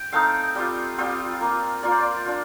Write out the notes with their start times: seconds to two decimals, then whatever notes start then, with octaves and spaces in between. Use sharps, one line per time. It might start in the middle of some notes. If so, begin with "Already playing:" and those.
Already playing: G5
0.12 A3 C4 D#4 F5
0.55 G3 C4 F4
0.98 G3 C4 F4
1.41 A#3 F4
1.83 A#3 F4 D5
1.91 C5
1.99 D5
2.25 D4 F4